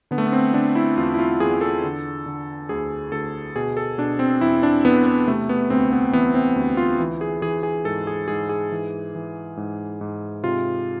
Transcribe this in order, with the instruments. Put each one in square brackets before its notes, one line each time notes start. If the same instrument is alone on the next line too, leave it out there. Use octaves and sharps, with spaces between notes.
[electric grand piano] D3 B3
A3
B3
C4
D3 D4
E4
E2 F4
E4
F4
E2 G#4
A4
D3
D3
D2 G#4
D2 A4
B2 G#4
A4
B2 D4
C4
E2 E4
D4
E2 B3
B3
C3 A3
B3
D2 C4
B3
E3 B3
C4
D2
F4
E3
G#4
E3 G#4
G#4
G#2 A4
G#4
G#2 G#4
G#4
E3
E3
G#2
G#2
C3 F4